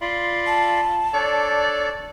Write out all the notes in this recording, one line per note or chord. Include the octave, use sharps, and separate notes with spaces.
F4 D5 B5 C6
A5
D4 A4 C#5 D5